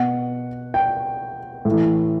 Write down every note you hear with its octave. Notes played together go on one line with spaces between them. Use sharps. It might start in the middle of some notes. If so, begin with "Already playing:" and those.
Already playing: B2 F#5
G5
A2
E3